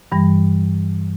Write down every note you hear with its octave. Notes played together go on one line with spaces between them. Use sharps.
G2 E3 G3